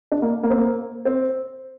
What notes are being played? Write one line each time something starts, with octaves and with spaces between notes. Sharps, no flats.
D4
A#3
A#3
C4
A#3
C4